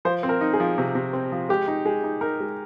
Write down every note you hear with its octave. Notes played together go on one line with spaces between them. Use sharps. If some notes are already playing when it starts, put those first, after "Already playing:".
F3 C5
C4
A#4
D#4
G#4
F3
C3
C3
C4
F3
G#3 G4
D#4
G#3 G#4
D#4
D#4 A#4
G#3